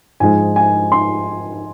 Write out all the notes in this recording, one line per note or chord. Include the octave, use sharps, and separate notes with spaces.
G#2 F3 G#3 G#5
G#5
C6